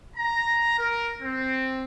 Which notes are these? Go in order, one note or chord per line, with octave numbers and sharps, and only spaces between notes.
A#5
A#4
C4